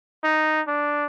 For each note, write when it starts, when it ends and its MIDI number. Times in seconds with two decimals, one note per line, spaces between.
0.24 0.62 63
0.67 1.05 62